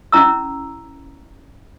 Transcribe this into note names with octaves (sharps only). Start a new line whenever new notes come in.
C#4 E4 A#5 E6